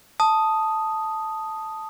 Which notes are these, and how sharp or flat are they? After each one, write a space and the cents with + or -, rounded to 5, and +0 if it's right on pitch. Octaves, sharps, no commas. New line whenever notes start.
A5 +0 D#6 +0